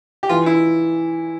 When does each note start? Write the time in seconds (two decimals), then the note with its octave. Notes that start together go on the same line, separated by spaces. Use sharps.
0.23 G4
0.29 E3 F4
0.46 E4